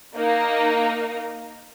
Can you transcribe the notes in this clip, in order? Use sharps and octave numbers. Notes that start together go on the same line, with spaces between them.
A#3 D#4